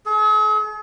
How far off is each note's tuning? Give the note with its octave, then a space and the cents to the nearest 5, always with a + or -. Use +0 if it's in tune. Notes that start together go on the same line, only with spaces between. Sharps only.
G#4 +45